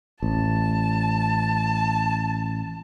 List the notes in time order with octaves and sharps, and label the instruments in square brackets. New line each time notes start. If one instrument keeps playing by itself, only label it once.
[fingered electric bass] A1 [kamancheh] A5